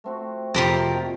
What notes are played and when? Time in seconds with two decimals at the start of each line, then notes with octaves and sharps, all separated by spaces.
0.04 A3 C4 F#4
0.54 F2 C3 F4 G4 A#4
0.91 A#2 D#3 F3